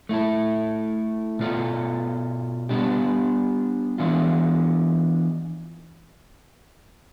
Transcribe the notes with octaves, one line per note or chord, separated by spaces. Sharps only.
A3 E4 A4
B2 B3 F4 A4
G3 B3 D4 G4
E3 B3 D4 F4